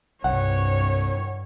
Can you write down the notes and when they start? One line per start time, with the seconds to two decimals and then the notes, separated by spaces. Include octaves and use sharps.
0.24 C2 G2 C#5 F#5